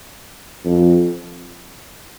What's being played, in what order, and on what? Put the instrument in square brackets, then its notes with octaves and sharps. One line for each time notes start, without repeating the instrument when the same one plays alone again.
[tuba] F2